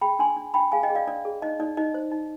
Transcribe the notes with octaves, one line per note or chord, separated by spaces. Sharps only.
G#4 G5 B5
D4 G#5 C6
D4
D4 G5 B5
G#4 F5 G#5
D#5 G5
G#4
D5 F5
D4 D5
G#4
D#4 D#5
D#4 D5
D#4 D#5
C5
D#4